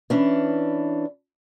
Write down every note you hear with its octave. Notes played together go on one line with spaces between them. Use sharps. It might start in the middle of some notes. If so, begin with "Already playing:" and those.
E3 C#4 D4